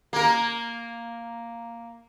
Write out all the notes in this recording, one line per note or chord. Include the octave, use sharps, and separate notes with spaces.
A#3 A#4